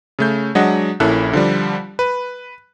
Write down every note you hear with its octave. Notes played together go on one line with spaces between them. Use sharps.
C#3 A3 G6
F#3 G#3 D4 D#5 F#5
A#1 A#3 C#4 E4 A4 F#6
D3 F3 G3
B4